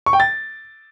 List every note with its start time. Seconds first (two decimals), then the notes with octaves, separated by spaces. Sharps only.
0.06 C#6
0.13 G5
0.20 A6